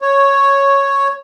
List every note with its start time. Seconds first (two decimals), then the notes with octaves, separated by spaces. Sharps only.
0.02 C#5